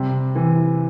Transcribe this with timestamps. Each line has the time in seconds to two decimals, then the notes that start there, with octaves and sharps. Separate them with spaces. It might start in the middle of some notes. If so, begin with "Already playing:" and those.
Already playing: C3 G3
0.36 E3